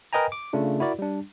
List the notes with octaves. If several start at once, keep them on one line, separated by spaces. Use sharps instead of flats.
A#4 B4 D#5 G5 G#5 A#5
D6
C#3 A3 D4 F4
E4 F#4 A#4 D5
G3 D4